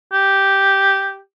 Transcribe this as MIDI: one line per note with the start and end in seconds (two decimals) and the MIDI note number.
0.13 1.19 67